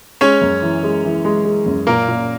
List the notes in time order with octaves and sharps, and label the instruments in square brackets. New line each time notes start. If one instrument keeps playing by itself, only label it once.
[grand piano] G#3 [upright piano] C#4 C#5
[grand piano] F#2
E3
G#3
E3
G#3
G#3
F#2
[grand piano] A#2 [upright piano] A#3 A#4
[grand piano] A#2